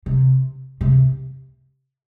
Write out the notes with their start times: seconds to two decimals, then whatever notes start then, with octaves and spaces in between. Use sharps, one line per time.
0.06 C3
0.81 C3